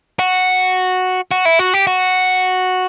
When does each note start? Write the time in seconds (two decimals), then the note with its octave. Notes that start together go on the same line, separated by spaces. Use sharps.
0.19 F#4
1.31 F#4
1.45 E4
1.59 F#4
1.74 G4
1.87 F#4